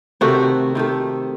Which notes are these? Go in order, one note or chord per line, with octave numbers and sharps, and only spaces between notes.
C3 D#3 A3 F#4
C3 D#3 A3